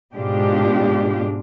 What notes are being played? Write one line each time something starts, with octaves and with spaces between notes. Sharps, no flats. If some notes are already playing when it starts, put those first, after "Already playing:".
G#2 B2 G#3 D4 F4 G4